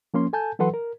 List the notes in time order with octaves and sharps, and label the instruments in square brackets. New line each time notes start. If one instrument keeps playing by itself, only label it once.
[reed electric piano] F3 A#3 C#4 C6
A4 G#5 A5 G6
E3 F#3 A4 B4 F#5 C6
A#4